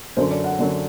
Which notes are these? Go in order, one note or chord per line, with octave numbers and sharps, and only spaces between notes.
F#2 D3 F#3 C5
D5
F#5
F#2 D3 F#3